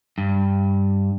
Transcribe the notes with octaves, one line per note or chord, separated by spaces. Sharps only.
G2